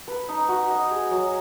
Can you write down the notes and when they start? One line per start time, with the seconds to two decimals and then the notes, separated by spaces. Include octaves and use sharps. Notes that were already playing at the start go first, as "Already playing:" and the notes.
0.08 B4
0.29 D#4
0.49 F#4
0.70 D#5
0.91 G#4
1.11 F#3